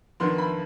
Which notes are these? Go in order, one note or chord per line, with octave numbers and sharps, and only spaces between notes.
F2 D#3 B3 D4 C6
B5